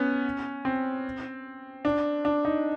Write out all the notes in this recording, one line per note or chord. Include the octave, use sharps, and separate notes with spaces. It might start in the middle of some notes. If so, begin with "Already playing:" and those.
Already playing: B3 C#4
C4
D4
D4
D#4